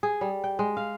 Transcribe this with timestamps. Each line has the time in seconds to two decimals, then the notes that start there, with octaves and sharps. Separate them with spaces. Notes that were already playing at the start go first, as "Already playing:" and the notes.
0.03 G#4
0.21 G3
0.44 G5
0.59 G#3
0.77 F5